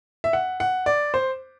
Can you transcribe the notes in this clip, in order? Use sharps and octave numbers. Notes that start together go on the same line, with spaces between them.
E5
F#5
F#5
D5
C5